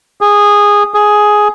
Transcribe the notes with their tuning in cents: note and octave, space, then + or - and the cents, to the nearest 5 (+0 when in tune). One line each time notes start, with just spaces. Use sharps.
G#4 -15
G#4 +5